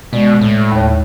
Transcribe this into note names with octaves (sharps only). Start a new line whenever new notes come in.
B2 G#3 D5
A2
D#2 C#5